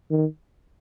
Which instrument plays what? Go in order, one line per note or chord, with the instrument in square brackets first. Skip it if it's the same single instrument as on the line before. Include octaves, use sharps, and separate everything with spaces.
[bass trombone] D#3